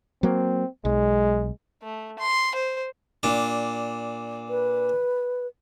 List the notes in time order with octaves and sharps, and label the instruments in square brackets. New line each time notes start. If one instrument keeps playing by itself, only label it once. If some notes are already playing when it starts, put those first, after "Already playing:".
[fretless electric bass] F#3 A#3 [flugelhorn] C4
[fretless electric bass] B1 [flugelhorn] G#3
[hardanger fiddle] A3
C6
C5
[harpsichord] A#2 D4
[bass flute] B4